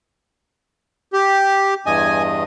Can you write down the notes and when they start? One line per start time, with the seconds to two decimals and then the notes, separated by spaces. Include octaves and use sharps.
1.13 G4
1.86 E2 G2 D#5 G#5